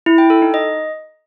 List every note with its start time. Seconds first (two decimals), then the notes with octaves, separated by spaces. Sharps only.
0.06 E4
0.18 G5
0.30 A4
0.42 D#4
0.54 D#5